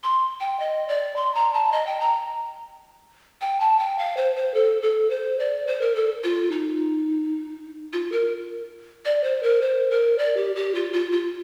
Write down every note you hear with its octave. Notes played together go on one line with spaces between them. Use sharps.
C6
G5
D#5
D5
C6
A#5
A5
D#5
G5
A#5
G5
A5
G5
F5
C5
C5
A4
A4
C5
D5
C5
A#4
A4
F4
D#4
F4
A#4
D5
C5
A#4
C5
A#4
D5
G4
G4
F4
F4
F4